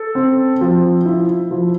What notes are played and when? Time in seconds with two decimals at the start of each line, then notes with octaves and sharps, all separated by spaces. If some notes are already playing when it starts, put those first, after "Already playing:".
Already playing: A4
0.15 C4
0.61 F3
1.06 E4
1.51 F3